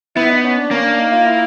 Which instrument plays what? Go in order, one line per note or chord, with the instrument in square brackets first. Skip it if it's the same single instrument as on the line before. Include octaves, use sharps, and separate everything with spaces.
[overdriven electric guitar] B3 [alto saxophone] E4
[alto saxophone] D#4
C#4
D4
[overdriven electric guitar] A#3 [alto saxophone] C#4
[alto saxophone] D4
D#4
F4
E4